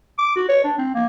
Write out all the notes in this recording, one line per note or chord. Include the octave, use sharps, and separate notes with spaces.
D6
F#4
C#5
D4
C4
A#3